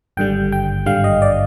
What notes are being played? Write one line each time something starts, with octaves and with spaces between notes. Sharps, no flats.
G#1 G2 D3 G3 G5
G5
G#1 G2 D3 G3 F5
D#5
D5